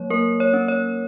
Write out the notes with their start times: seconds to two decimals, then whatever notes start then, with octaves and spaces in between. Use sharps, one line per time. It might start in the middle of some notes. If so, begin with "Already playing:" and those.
Already playing: F#3 A#3 C#5
0.10 A#3 A#4
0.40 C#5
0.53 C#4
0.68 C#5